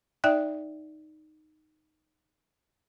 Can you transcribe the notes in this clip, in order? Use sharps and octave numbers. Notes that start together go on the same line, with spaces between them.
D#4 D5 E5 G5 F#6